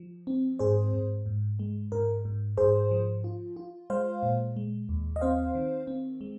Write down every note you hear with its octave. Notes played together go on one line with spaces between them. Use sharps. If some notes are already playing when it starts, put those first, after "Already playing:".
Already playing: F3
C4
G#2 G#4 C5
G#2
G#2
G#3
G#2 A#4
G#2
G#2 G#4 C5
F3
F4
F4
G#3 C5 F5
A#2
G#3
D#2
D#5
C4 C5 F5
D#3
C4
G#3